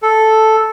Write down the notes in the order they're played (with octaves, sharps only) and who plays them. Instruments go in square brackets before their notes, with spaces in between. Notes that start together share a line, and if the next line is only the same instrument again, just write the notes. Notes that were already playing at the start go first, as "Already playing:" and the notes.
[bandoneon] A4